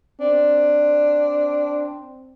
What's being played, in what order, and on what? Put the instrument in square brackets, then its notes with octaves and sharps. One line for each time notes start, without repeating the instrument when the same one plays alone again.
[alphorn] C4 [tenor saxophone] D4